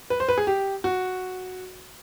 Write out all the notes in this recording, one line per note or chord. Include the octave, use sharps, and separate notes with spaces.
B4
C5
B4
G#4
G4
F#4